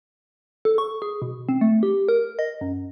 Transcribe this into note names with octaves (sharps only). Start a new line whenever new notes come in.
A4
C#6
G#4
B2
C4
A3
G4
A#4
D#5
F#2